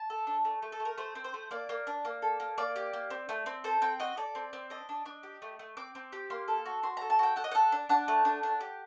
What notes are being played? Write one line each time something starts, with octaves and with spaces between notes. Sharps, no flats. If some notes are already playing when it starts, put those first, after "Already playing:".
Already playing: A5
A4
D4
A3
A3
A4
A3
A#4
A3 C5
C4
C5
A3
A#3 D5
A#3
D4
A#3
A4
A#3
A#3 D5
G4
A#3
C4
A3
C4
A4 C5
C4 G5
F#4 D#5
A4 D5
C4
C4
D4 D#5
D4
D4
G4
A3
A3
C4 D6
C4
G4
A#3 C6
A4
F#4
F#4 C6
A4 A#5
A5
F#4 G5
A4 F#5
D#5
A4 F#5
D4
D4 F#5
A3
D4
D4
G4